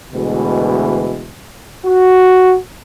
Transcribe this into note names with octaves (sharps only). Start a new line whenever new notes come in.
D2 B2 E3 G#3
F#4